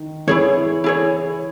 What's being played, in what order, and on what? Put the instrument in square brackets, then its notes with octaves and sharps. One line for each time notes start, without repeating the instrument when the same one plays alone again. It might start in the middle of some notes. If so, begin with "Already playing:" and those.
Already playing: [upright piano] D#3
[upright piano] E3 [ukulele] E4 G#4 C#5
[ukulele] E4 G#4 C#5